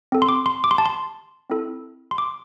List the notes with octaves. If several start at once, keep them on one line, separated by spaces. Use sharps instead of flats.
C4 A4
C6
D6
C6
D6
C6
A5
C6
C4 E4 A4
C6
D6